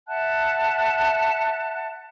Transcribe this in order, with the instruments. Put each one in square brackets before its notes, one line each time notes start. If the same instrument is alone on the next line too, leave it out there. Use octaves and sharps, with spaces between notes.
[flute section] E5 F#5 A5 F#6